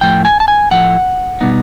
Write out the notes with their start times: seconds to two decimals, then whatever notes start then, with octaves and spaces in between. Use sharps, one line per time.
0.01 A2 F3 A3 G5
0.25 G#5
0.40 A5
0.48 G#5
0.71 A2 F3 A3 F#5
1.41 B2 G3 B3 D#4